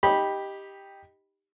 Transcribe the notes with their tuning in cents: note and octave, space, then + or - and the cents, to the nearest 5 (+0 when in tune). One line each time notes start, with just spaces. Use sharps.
D#4 +0 G4 +5 B5 -15